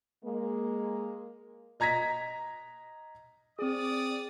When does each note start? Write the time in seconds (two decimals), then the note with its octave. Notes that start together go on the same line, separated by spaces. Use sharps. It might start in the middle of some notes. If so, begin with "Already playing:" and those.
0.24 G#3 A#3
1.80 D#5 A#5 G#6 A#6 B6
3.59 C4 G#4 D5 D#6